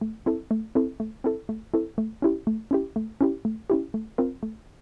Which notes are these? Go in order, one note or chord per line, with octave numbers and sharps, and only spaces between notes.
A3
C4 E4 A4
A3
C4 E4 A4
A3
C4 E4 A4
A3
C4 E4 A4
A3
C#4 E4 G4
A3
C#4 E4 G4
A3
C#4 E4 G4
A3
C#4 E4 G4
A3
C4 F4 A#4
A3